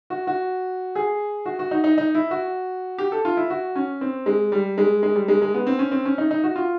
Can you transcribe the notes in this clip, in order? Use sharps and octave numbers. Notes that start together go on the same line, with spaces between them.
F#4
F#4
G#4
F#4
F#4
D#4
D#4
D#4
E4
F#4
G4
A4
F4
E4
F#4
C#4
C4
G#3
G3
G#3
G#3
G3
G#3
G#3
B3
C4
C#4
C4
C#4
D#4
D#4
F#4
F4